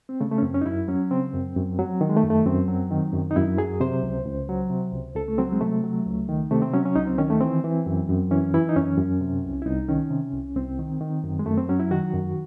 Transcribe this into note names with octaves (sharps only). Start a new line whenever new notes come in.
C4
C#3 A3
A3
C#4
F#2 C4
C#4
D#4
F#2 E4
F#3 C#4
C#3 C4
F#2
F#2
F#3
D#3
G#3
A3
F#2
A3
F#2 C4
F#3
D#3
F#2
D#4
F#2 E4
F#3 G#4
C3 C5
C#2
C#2
F#3
C3
C#2
C#2 A4
A3
F#3 C4
G#3
C3 A3
F#3
C#2
D#3
C3 A3
C4
F#3 C#4
C#4
C#2 D#4
C4
D#3 C#4
A3
E3 C4
E3
F#2
F#2
E3 C#4
E3 E4
D#4
F#2 C#4
F#2
C3
C2
E4
C2 D#4
D#3 C#4
C3
C2
C2 C4
D#3
D#3
F#2
G#3
F#2 A3
C4
F#3 C#4
E4
D#3 F#4
F#2